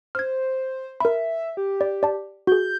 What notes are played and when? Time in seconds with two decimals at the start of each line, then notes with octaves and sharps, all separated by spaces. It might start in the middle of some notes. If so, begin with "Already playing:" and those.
0.15 C5 F6 G#6
1.00 A#4 E5 B5
1.57 G4
1.81 D5
2.03 D5 A5
2.47 F#4 G#4 G6